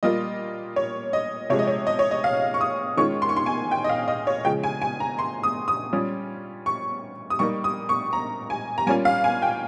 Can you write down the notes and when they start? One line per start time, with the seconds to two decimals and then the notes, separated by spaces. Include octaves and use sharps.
0.03 A#2 G3 A#3 F4 D#5
0.76 C#5
1.13 D#5
1.50 C3 F3 G#3 C#5
1.59 D#5
1.67 C#5
1.87 D#5
1.99 C#5
2.11 D#5
2.24 F5
2.54 C#6
2.61 D#6
2.97 D#3 G#3 C#4 F4 C#6
3.22 C6
3.29 C#6
3.37 C6
3.46 G#5
3.71 G5
3.84 D#5
3.89 F5
4.08 D#5
4.27 C#5
4.45 C#3 F3 G#3 G5
4.63 G#5
4.82 G#5
5.00 A#5
5.19 C6
5.43 D#6
5.68 D#6
5.93 G3 C#4 F4
6.66 C#6
7.30 D#6
7.39 G3 A#3 D#4 C#6
7.64 D#6
7.89 C#6
8.13 A#5
8.50 G#5
8.78 A#5
8.87 G3 A#3 C#4 F4 G#5
9.05 F5
9.24 G#5
9.42 G5